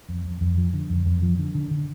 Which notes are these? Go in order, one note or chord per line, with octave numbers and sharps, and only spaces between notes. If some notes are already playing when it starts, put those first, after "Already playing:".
F2
F2
F2
F3
D3
F2
F2
F3
D3
D3
D3